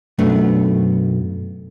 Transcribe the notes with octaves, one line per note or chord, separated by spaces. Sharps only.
B1 F#2 A3 B3 D4